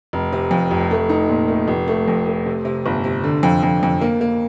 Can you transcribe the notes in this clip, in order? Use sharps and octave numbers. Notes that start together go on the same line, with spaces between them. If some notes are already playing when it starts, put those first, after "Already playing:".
F1
C3
F2
F1
A3
D#4
A#2
A3
F1
A3
F2
A3
C3
C3
G1
C3
D3
F2
F2
F2
A#3
A#3